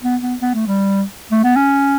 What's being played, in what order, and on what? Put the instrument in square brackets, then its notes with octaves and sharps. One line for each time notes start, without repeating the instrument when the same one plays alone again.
[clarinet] B3
B3
B3
A3
G3
A3
B3
C#4